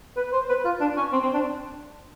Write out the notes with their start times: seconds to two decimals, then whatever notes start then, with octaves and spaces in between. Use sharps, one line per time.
0.17 B4
0.33 C5
0.49 B4
0.65 F4
0.80 D4
0.97 C#4
1.12 C4
1.22 C4
1.34 D4